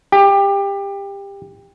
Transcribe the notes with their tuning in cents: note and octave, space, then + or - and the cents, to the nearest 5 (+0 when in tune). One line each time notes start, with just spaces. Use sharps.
G4 +20